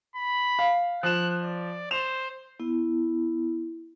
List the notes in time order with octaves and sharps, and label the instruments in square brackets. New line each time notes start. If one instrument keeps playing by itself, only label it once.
[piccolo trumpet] B5
[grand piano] F5
[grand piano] F3 E7 [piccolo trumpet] F#6
[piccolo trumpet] D5
[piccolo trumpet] C5 [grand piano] E7 F7
[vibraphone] B3 E4